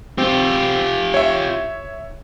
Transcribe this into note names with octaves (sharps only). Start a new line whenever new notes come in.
C4 F4 G4
C#5 E5